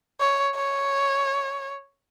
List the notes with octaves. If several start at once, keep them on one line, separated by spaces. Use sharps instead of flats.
C#5
C#5